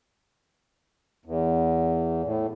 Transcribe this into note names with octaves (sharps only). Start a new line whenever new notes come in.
E2
A2